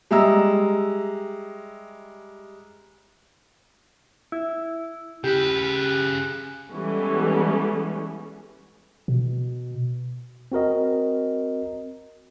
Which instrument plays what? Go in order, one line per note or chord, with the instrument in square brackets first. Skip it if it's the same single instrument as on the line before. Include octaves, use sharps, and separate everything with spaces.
[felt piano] G3 G#3 E5 A#5 E6
[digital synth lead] E4
[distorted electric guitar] C#3 B4 [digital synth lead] G4
[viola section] E3 G3 G#3 B3 C#4 A4
[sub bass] B2
[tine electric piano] C4 F#4 A#4 D#5